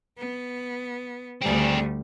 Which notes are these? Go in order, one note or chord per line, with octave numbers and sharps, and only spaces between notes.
B3
D2 G3 C4 G#4